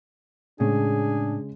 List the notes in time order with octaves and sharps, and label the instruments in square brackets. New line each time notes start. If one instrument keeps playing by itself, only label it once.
[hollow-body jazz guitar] A2 [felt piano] C#3 G#3 [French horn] D4 [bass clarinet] G#4